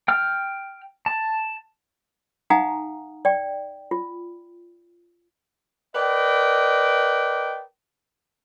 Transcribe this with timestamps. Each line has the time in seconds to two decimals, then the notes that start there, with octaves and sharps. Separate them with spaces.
0.08 G5 F6
1.06 A5
2.50 D#4 F5 F#5 G#5 A#5 D#6
3.25 D5 G5
3.91 F4
5.95 A#4 B4 D5 D#5 G5